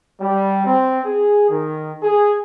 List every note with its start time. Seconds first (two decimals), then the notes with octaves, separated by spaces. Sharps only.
0.21 G3
0.66 C4
1.06 G#4
1.50 D#3
2.03 G#4